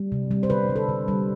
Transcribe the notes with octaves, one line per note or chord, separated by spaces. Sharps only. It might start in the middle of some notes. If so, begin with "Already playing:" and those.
Already playing: G3
C3
G3
C5
D3 B4
G3
A4
D3
G3